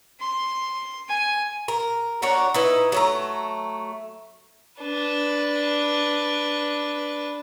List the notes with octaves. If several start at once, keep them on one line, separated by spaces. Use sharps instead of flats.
C6
G#5
A#4
D4 F#4 A#4 C#5
D#4 E4 B4
F#3 A3 A#5
D4 B4